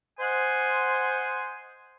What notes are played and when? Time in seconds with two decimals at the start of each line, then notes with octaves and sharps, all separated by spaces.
0.20 C5 D#5 F#5 G#5 C6